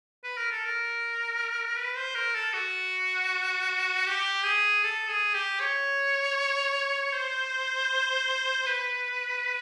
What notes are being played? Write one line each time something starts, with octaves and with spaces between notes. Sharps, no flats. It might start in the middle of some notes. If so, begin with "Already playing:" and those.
B4
A#4
A4
A#4
B4
C5
A#4
A4
F#4
G4
G#4
A4
G#4
G4
C#5
C5
B4